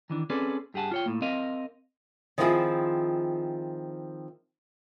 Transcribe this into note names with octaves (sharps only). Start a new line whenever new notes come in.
D#3 E3 D4
C4 C#4 G#4 A4 B4 D5
G2 G4 G#4 F#5 A5
F4 C#5 G5
A2 A#3
C4 A#4 D#5 F5
D#3 F3 C4 E4 F4 G#4